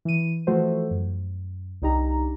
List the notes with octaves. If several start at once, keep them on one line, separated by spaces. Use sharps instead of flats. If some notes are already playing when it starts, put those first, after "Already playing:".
E3 D#7
E3 F3 A3 F#4 A4 C5
F#2
C2 D4 D#4 G4 A#5